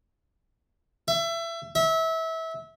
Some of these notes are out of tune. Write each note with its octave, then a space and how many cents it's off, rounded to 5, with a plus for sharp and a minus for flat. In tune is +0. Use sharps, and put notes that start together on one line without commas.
E5 +25
E5 -25